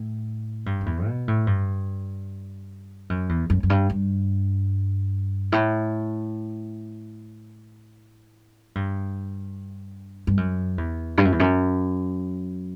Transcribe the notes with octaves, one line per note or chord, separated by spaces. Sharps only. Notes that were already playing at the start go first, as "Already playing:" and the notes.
Already playing: A2
G2
F#2
E2
B2
A2
G2
F#2
E2
F#2
F#2
G2
G2
A2
G2
G2
F#2
E2
G2
F#2
E2
F#2